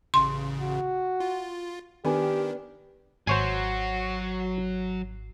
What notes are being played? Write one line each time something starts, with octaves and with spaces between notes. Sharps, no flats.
A1 C#3 C6
F#4
F4
D#3 B3 D4 G4 G#5
G#1 F#3 F#4 C5 C#5 G#5 C7